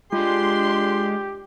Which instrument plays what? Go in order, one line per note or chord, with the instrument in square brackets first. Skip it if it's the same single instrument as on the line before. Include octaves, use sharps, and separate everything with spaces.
[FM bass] G#3 [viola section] D4 C6 [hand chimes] F4 [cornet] G4